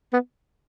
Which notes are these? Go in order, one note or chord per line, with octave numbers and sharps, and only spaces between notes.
B3